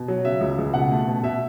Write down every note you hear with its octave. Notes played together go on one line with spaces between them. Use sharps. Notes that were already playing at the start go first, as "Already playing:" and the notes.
Already playing: B2
F#3
C#3 E5
C#2
C#2
B2 F#5
A3
B2
B2 E5